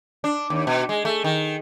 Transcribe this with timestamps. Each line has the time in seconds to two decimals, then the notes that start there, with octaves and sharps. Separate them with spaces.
0.24 D4
0.50 D#2
0.67 B2
0.89 G#3
1.05 A3
1.24 D#3